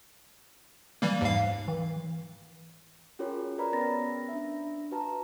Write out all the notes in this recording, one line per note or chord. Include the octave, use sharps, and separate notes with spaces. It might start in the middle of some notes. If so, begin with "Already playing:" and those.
E3 G3 A#3
D#2 G#2 F5
E3
C#4 F4 F#4 G#4 A#4 C#5
A#4 B4 D5 A#5 B5
B3 C#4 A#4 B5 A6 A#6
D4 E5
F#4 B4 A5 A#5